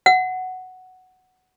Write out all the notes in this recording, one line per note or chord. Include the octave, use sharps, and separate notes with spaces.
F#5